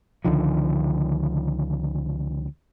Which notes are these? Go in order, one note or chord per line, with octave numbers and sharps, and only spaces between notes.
C#2 D3 D#3 F3